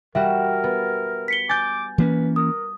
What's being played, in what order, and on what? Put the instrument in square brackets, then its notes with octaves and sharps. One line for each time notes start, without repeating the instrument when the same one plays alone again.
[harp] G3 F#4 E7 [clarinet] A#4 [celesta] E5
[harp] B3
[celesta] B6 C#7 G7
[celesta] G#5 [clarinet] D6 [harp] G6 A6
[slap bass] E3 A#3 C#4 [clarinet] B4
[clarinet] A#4 [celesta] D#6